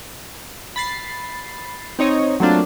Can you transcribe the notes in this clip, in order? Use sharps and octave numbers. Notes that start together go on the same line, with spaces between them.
B5 A6 C7
C4 D#4 C#5 D#5
F#3 A3 A#3 C4 D4 F4